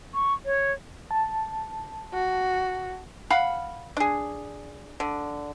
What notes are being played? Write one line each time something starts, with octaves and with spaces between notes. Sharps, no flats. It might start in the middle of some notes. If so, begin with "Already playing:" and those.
C#6
C#5
A5
F#4
F5 F#5 B5
D4 G#4
D3